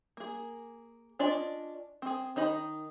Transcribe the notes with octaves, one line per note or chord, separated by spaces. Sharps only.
A#3 G#4
C#4 D4 F4 D5 D#5
C4 G#4
D#3 D#4 D#5 B5